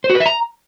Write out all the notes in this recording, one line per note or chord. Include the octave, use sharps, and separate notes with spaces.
C5
F#4
B4
E5
A#5